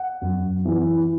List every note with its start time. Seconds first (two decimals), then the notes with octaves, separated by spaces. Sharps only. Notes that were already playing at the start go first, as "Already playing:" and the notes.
Already playing: F#5
0.21 F#2
0.65 E3